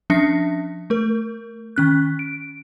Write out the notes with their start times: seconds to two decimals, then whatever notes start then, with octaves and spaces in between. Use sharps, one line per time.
0.10 F3 C#4 D4 E5 A#6 C#7
0.90 A3 A#4
1.76 D#3 C#4 F#6
2.19 D7